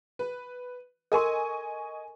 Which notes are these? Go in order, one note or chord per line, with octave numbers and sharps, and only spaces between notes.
B4
A4 A#4 D#5 G#5 C6 C#6